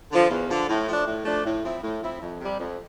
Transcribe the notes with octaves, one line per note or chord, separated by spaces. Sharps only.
D3 F3
E2
D3 F3
A2
F3 A3 D4
A2
F3 A3 D4
A2
F3 C4 E4
A2
F3 C4 E4
F2
C3 G3
F2